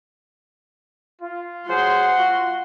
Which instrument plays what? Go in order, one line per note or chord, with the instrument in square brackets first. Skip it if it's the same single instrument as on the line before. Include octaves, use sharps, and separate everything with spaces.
[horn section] F4
[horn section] F#3 G#4 C5 [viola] F#5 C6
[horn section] F4 F#4